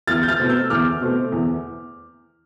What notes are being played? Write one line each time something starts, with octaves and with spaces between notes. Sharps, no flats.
E2 F6 A6
G6
F6 A6
B2 A3 C4
E6 G6
E2 D6 F6
B2 A3 C4
E2